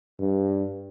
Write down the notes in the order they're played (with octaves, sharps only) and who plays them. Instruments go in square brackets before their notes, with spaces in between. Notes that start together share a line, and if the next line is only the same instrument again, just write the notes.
[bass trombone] G2